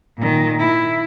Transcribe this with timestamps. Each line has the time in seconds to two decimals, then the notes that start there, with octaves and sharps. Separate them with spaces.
0.18 A#2 D#3
0.59 E4